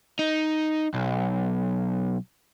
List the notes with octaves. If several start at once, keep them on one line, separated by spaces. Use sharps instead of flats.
D#4
B1